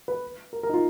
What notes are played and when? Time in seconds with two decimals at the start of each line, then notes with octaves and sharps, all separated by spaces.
0.08 B4
0.53 A#4
0.63 A#4
0.69 D#4
0.74 F4